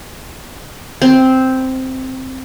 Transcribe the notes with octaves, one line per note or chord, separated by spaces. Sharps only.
C4